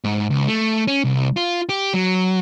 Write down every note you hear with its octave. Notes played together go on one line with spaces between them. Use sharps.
G#2
C#2
A3
C#4
C2
F4
G4
F#3